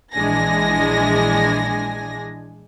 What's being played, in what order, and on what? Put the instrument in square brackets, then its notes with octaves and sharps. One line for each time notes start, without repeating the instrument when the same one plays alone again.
[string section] A#1 E3 G#3 D4 G#5 A#6